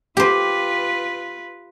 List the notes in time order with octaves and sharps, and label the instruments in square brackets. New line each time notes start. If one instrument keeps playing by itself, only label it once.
[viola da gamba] F4 B4 [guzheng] G4 C5